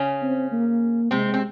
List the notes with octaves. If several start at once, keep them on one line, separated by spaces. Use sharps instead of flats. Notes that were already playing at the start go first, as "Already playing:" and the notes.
Already playing: C#3 C#4
C4
A#3
C3 G#3 C4
C4